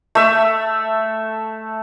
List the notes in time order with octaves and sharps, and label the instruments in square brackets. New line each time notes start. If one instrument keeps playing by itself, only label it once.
[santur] A3 E5